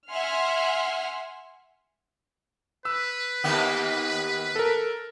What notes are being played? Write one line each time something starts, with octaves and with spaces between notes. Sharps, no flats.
E5 F#5 G#5 C6 F6
B4 E6
D#2 A#3 B3
A4 A#4